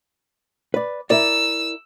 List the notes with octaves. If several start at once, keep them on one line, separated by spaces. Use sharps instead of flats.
B4 D5
E4 A#4 D5 E6